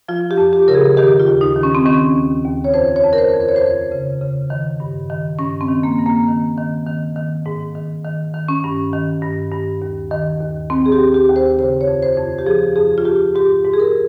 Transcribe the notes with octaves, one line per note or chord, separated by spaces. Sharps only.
F3 F4
G4
F2
G4
C#3 A#4
G#4
D#3 G4
F4
D#2
D#4
D#3
C#4
C4
D#3 C#4
D#2
D#2
C#5
F2 C5
C#5
F2
A#4
C5
F2
C5
C#5
C5
F2
C#3
C#3
D#3
G2
D#3
G2 C#4
C4
D#3
A#3
G2
A#3
D#3
D#3
D#3
D#3
G#2
D#3
D#3
D#3
C#4
G2
D#3
G2
G2
D#2
D#3
D#2
D#2 C4
G#4
G4
D#2
G4
D#2
C5
C#3 C5
C#5
F2
C5
F2
G4
F3 G#4
F2 G#4
F4
F2 G4
G#2 G4
G#2
G#4
A#4